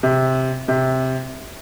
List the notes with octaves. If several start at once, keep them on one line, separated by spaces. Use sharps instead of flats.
C3
C3